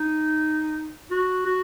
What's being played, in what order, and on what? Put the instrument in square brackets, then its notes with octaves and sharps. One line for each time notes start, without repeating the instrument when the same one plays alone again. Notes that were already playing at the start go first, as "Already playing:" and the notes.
Already playing: [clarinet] D#4
F#4
F#4